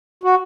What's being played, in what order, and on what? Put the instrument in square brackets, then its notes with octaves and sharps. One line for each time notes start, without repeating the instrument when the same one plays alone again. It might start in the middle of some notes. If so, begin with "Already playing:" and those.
[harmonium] F#4